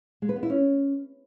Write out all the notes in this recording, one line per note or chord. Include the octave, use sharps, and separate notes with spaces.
G#3
B4
B3
E4
C#4